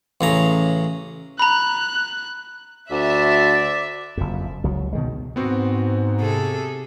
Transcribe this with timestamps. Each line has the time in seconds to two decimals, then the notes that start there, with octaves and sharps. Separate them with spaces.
0.21 A1 C#3 A#5
1.39 A#5 B5 F#6
2.91 D2 D5 E5
4.17 F#1 F2
4.64 C#2 F#3
4.93 B2 D#3 G#3
5.36 G#2 B3 C4 F#4
6.20 C3 G#4 A4